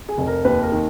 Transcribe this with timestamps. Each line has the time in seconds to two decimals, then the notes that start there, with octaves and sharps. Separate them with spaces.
0.09 G#4
0.18 F1
0.27 A#4
0.45 D#2 B4
0.62 A#4
0.72 D#3